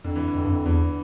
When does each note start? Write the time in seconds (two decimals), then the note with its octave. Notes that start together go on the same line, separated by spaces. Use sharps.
0.05 F2 D3
0.16 E3
0.28 D3
0.35 F2
0.45 G2
0.50 F2
0.66 E2 E3